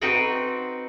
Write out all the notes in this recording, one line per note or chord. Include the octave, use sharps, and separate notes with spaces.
C4 D#4 F#4 B4 D#5 G5